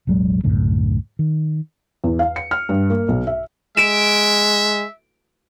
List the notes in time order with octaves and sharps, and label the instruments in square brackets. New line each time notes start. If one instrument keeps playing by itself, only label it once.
[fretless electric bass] E1 A1 F#3 G#3
C2 F#2 A2 D3
D#3
[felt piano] E2
F5
C#7
F6
G2
A#3
B1
E5
[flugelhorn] G#3 [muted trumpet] E5 [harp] D7 E7